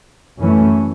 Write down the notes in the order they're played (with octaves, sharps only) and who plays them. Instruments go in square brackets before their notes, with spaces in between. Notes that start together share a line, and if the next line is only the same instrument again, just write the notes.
[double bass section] F#2 E3 A3 C#4